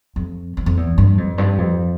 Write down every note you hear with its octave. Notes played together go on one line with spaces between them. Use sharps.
F2
E2
F2
E2
G2
F2
G2
F2